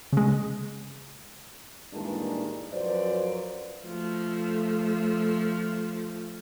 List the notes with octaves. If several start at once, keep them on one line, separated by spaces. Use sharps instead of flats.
C#3 G#3
G2 A#2 D#3 E3 G#3 D4
F#2 F3 F#4 B4 C5 D5
F3 A3